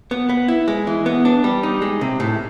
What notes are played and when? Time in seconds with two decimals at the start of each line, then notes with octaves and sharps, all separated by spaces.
0.11 B3
0.29 B3
0.48 E4
0.68 G#3
0.87 E3
1.06 B3
1.25 D4
1.44 G3
1.63 D#4
1.82 G#3
2.01 C3
2.20 A2